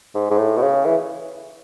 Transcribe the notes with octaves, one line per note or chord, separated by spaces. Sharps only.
G#2
G#2
A2
B2
C#3
E3